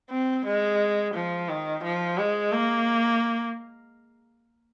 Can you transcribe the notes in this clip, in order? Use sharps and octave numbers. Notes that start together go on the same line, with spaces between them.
C4
G#3
F3
D#3
F3
G#3
A#3